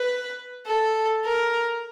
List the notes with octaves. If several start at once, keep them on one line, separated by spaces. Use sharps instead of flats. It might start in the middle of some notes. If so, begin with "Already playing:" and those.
Already playing: B4
A4
A#4